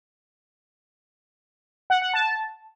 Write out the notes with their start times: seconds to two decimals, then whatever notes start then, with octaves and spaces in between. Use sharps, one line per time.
1.90 F#5
2.02 F#5
2.14 A5